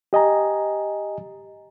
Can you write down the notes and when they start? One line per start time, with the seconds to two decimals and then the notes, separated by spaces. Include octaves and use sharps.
0.13 G4 D#5 G#5 A#5